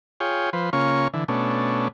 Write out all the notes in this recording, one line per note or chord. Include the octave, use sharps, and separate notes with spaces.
F4 G#4 C#5 G5
F3 B4 C5
C#3 A#3 C#4 F4 C#6
D3 E3
B2 A3 C#4 D4